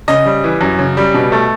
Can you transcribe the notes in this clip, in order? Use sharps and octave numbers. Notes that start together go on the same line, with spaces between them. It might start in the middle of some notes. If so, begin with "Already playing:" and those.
C#3 D#5
G3
E3
F#2
C#3
G3
B2
A3